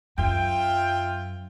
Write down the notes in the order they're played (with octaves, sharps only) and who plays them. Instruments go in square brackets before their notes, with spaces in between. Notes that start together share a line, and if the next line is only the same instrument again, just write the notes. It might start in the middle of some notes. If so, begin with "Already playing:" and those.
[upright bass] F#2 [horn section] F4 E5 G5